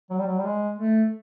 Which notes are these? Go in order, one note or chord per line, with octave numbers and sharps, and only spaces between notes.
F#3
G3
F#3
G3
G#3
A3